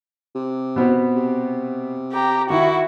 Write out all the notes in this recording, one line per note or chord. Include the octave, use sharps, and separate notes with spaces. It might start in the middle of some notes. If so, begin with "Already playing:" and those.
C3
B2 B3 C4
C3
G4 A#5
D#3 E4 F#4